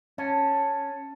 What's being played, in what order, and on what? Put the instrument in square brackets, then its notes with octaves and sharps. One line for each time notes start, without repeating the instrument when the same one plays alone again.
[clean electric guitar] C#4 [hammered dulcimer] A5